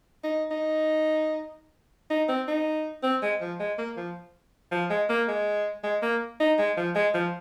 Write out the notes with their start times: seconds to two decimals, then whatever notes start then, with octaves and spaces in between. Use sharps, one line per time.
0.24 D#4
0.51 D#4
2.10 D#4
2.29 C4
2.48 D#4
3.03 C4
3.22 G#3
3.41 F3
3.60 G#3
3.78 A#3
3.97 F3
4.72 F3
4.90 G#3
5.09 A#3
5.28 G#3
5.83 G#3
6.02 A#3
6.40 D#4
6.58 G#3
6.77 F3
6.95 G#3
7.14 F3